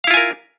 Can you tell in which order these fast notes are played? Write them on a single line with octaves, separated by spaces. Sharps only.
F5 E4 F4 G#5 A#4